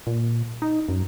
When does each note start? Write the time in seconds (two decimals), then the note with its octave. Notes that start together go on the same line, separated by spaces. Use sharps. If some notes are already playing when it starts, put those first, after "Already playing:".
0.07 A#2
0.62 D#4
0.89 F#2